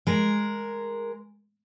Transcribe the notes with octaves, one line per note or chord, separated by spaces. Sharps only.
G#3 A#4